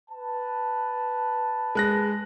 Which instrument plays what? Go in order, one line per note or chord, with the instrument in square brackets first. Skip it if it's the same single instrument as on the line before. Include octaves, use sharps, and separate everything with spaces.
[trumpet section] B4 A5
[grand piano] G#3 F#6 A#6